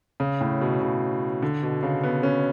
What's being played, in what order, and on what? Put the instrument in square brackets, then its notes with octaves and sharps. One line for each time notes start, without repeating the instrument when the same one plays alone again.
[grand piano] C#3
A2
B2
C#3
D3
B2
C#3
B3
C#4